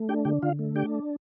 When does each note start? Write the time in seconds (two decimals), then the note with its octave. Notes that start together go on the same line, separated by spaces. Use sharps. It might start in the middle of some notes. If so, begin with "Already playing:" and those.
Already playing: A3
0.09 D4 G4 G5
0.25 D3 G4 G5
0.42 D3 F4 F5
0.59 A3
0.75 D4 G4 G5